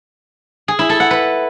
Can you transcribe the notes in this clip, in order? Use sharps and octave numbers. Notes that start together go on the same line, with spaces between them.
G#4
E4
A4
F#5
B4